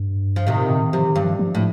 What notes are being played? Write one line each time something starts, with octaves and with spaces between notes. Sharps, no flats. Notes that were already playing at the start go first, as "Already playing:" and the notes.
Already playing: G2
F3
A2 C3 D#3
A#2
D3
D#3
C3 F3
D#3
G2
F3
F3
A2